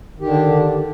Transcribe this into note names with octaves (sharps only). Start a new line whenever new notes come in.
D3 D#3 D4 G4